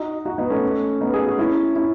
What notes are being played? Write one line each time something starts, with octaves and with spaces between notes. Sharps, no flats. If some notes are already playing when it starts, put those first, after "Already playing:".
Already playing: D#4 F#4
D#4 F#4
B3 D#4
A3 C#4
B3 D#4
G#4
F#4
C#4 E4
C#4 E4